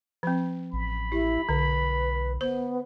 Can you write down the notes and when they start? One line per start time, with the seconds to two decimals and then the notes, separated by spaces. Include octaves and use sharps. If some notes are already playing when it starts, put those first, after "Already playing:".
0.23 F3 C4
0.73 A1 B5
1.12 E4 G4
1.49 B1 D3 B4
2.41 B3 C5